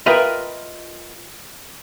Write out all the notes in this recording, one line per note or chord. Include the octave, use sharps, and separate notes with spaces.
F4 A#4 B4 D#5 E5 G5